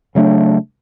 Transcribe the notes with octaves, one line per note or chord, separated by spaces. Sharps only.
C#3 F#3 A3 D4